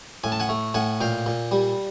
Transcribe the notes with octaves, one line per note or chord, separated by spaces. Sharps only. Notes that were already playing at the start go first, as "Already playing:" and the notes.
A2 G#5
A5
F#5 G#5
A3
A2 F#5 G#5
A#2 F5 G5
A#2
G3